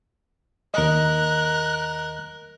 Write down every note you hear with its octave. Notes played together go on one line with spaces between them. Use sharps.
D#2 A#4 D#5 F#6